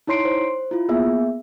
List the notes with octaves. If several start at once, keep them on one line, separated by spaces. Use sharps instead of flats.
D#4 E4 C#5 C6 C7 D7
C5
E4 F4
A#3 B3 G#4 E5